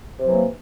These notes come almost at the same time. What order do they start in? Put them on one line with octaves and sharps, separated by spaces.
C3 F#3 E3 A#3